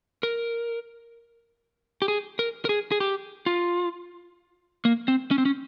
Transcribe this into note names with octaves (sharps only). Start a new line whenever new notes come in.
A#4
G4
G#4
A#4
A#4
G#4
G#4
G4
F4
A#3
C4
C#4
C4
C#4